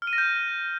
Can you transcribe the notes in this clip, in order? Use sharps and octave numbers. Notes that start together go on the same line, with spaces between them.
F6
D#7
A#6
G6